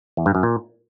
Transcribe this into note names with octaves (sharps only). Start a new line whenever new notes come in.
E2
G2
F#2
A#2